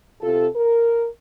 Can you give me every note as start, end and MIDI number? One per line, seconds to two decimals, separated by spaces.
0.21 0.47 48
0.21 0.47 65
0.21 0.47 69
0.55 1.07 70